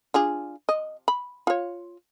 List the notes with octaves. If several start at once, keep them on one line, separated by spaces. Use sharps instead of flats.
D4 F4 G#4
D#5
B5
F4 C#5